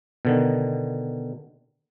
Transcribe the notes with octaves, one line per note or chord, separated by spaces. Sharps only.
B2 D3 D#3